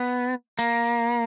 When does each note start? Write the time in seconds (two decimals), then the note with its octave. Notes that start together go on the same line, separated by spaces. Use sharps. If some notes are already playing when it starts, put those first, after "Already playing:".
Already playing: B3
0.59 A#3